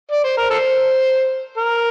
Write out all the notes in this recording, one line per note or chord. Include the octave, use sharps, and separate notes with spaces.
D5
C5
A#4
A4 C5
A#4